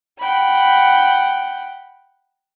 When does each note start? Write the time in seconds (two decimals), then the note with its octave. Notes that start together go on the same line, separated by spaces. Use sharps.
0.19 F#5 G5 B5